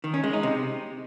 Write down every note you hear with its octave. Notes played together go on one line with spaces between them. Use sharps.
D#3
C#4
G#3
D#4
C3